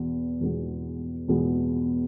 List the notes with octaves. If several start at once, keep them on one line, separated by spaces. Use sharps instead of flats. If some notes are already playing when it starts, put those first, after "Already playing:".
Already playing: E2 B2 B3
E2 B2 G#3 B3
E2 B2 G#3 B3